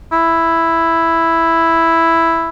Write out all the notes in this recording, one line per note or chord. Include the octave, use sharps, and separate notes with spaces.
E4